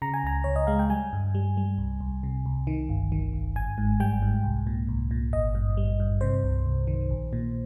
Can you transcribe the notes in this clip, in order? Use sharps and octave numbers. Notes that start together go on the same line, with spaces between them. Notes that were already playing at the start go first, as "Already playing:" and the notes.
C#3 A#5
G#5
C#2 A#5
C#2 C#5
D#5
G#3 F5
G5
G3 G#5
G2
G3
G3
C2
C2
C3
C2
D#3
G1
D#3
G1
G#1 G#5
G#2
G3 G5
G#2
C2
A#2
C2
A#2
G#1 D#5
G2
G3
G2
C3 C5
C2
C2
D#3
A#1
A#2